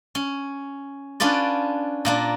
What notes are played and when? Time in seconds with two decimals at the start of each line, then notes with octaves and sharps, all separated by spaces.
0.15 C#4
1.20 C#4 D4 F4 B4 D5
2.05 A#2 A#3 D4